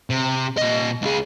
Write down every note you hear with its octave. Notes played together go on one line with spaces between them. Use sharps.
C3
A#2 D#5
C#2 G#4